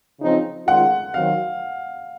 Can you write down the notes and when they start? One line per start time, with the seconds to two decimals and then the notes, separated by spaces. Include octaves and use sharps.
0.20 C#3 F3 C4 D#4
0.67 D#3 G#3 C#4 F4 F#5
1.14 D#3 F#3 C4 F5